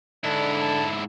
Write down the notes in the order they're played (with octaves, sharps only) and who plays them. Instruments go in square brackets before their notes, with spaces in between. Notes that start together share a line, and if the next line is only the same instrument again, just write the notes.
[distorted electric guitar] G#2 E4 [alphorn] D3 [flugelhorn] D4
[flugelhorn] A5